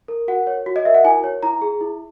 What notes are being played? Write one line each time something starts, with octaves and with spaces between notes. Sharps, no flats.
A#4
F#4 F#5
C#5
F#4
D#5
A#4 E5
F#5
E4 G#5
C#5
E4 A#5
G#4
E4